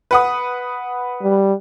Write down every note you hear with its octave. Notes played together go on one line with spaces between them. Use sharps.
B4 F#5 D#6
G3